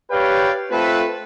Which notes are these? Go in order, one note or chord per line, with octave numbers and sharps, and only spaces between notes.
G4 B4 C#5 D5 F5 G5
A3 C4 F4 A4 B4